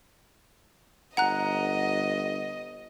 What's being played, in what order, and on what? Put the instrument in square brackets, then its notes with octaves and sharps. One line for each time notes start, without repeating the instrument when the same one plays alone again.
[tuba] G1 [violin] D#5 [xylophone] F#5 A#5 F#6